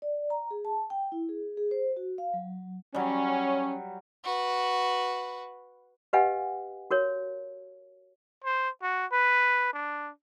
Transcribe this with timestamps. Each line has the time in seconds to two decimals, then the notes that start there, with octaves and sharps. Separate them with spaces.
0.02 D5
0.30 A#5
0.51 G#4
0.65 A5
0.90 G5
1.12 E4
1.29 G#4
1.57 G#4
1.71 C5
1.97 F#4
2.18 F5
2.34 F#3
2.95 F#3 G3 C#4
4.24 F#4 B4
6.13 G4 B4 D#5 F5 F#5 G#5
6.91 F#4 A#4 C#5
8.44 C5
8.82 F#4
9.12 B4
9.73 D4